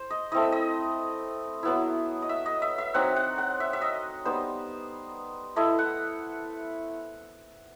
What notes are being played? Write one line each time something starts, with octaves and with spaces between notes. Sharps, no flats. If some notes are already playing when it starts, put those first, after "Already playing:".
Already playing: C5
D#5
A3 C4 E4 D#5
E5
D#5
F#3 B3 E4
D#5
E5
D#5
E5
E5
F#3 C4 D#4 F#5
F#5
F#5
E5
E5
D#5
G3 B3 D#4 C5
A3 E4 D#5
F#5